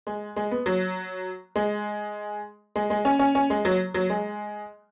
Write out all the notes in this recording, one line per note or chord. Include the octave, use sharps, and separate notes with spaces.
G#3
G#3
B3
F#3
G#3
G#3
G#3
C#4
C#4
C#4
G#3
F#3
F#3
G#3